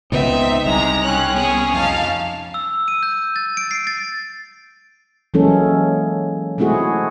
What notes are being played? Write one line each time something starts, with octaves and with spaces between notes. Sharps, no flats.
C#2 C#3 B3 C4 D#4 E5
C2 C3 G#3 A#5
C#4 C#5 G5 F#6
B3 C4 G#4 C#5
F2 D#4 F5 A5
E6
D#7
G6
A6
D7
C7
A6
E3 F#3 G#3 A#3 C#4 A4
G#3 A3 C4 E4 F#4 G#4